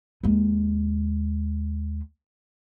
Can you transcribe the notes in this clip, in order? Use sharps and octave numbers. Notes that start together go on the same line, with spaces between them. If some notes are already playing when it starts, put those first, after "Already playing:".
D#2 G#3